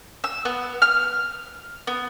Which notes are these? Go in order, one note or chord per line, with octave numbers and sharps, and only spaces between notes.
E6
B3
F6
B3